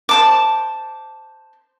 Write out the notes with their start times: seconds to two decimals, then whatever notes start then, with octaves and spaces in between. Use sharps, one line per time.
0.09 C5 A5 D6